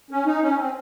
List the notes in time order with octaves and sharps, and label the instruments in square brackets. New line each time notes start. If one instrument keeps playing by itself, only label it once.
[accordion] C#4
D#4
C#4
C4